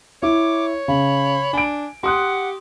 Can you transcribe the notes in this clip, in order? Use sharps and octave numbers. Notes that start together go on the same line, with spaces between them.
E4 C#5 D6
C#3 B5
D4 G#5 D7
G4 F#5 C6 D#6 F#6